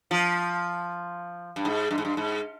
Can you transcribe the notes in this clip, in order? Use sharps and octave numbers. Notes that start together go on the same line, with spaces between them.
F3
G2
G#2
G2
G#2
G2
G#2